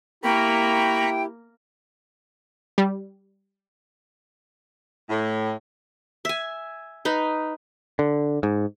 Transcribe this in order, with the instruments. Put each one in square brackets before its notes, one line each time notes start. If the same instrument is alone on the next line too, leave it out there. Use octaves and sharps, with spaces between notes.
[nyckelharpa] A#3 [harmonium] E4 G4 [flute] G5 [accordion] A#5 B5 C#6
[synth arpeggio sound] G3
[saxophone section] A2
[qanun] E5 G#5
D#4 B4
[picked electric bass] D3
G#2